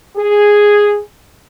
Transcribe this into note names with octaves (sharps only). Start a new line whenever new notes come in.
G#4